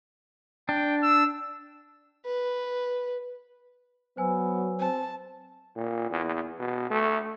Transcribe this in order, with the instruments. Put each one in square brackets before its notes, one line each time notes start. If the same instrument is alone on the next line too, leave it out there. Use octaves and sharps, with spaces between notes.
[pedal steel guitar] D4 [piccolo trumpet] G5
[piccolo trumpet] E6
[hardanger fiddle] B4
[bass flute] F#3 [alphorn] B3 [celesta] C5 G#5 E6
[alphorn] C4 [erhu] A5
[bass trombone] A#2
E2
B2
A3